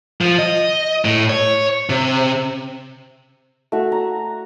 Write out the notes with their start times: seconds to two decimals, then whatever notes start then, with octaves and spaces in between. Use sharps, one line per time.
0.21 F3
0.39 D#5
1.05 A2
1.30 C#5
1.89 C3
3.72 A3 F#4
3.92 A#5